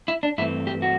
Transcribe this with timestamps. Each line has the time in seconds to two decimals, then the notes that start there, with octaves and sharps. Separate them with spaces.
0.08 E4
0.23 D4
0.38 G2 E3 A3 C4 E4
0.67 G4
0.82 F#4